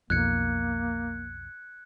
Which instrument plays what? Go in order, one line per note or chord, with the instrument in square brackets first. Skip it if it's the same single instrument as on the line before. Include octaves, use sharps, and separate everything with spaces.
[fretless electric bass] B1 F2 [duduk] A#3 [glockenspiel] F#6 G#6 C#7